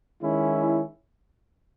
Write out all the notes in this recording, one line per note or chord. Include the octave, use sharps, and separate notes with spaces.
D#3 G#3 C#4 E4